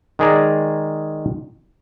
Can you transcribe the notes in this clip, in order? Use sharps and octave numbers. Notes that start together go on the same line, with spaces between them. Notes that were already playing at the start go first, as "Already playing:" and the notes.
D#3 G#3 G#4 D5 A#5